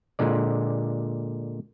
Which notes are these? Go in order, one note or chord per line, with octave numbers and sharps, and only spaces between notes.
A#2 D3 G#3 D5